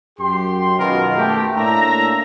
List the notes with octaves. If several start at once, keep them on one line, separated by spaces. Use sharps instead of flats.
F#2 G4 C6
F#2 B2 D#3 G#3 F4 A#4
A3 G4
A2 A#3 D4 E5 A#5